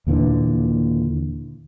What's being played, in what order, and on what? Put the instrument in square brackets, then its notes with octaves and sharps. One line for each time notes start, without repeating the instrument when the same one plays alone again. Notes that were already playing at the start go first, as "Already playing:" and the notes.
[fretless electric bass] D#2 A#2 D3 E3